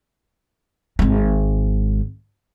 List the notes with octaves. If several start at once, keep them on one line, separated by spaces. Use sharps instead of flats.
G#1 G#3